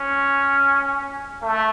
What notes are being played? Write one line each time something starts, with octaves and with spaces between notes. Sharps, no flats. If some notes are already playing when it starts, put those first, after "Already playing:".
Already playing: C#4
A3